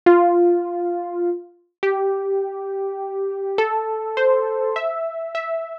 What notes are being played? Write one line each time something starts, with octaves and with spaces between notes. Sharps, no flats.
F4
G4
A4
C5
E5
E5